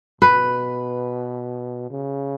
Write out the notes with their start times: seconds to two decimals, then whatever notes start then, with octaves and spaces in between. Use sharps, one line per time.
0.21 B2 B4
1.90 C#3